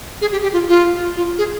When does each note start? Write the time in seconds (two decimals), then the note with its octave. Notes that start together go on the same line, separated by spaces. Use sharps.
0.21 G#4
0.32 G4
0.43 G4
0.53 F4
0.69 F4
1.17 F4
1.38 G#4